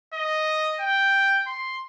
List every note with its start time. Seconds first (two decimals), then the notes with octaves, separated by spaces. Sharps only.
0.14 D#5
0.81 G5
1.47 C6